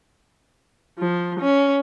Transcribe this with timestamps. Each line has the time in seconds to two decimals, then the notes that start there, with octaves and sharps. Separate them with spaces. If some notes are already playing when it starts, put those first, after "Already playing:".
0.99 F3
1.40 C#4